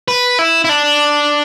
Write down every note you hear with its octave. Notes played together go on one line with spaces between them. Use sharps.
B4
E4
E4
D4